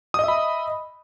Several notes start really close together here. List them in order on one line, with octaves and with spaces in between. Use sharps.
D#6 D#5 E5 B5